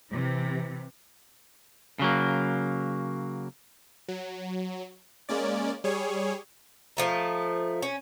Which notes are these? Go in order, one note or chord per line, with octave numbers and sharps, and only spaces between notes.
C3 E3
C#3 F#3 A#3
F#3
G#3 A#3 C#4 D5
G3 G#4 C#5
F3 A3 D#4
C#4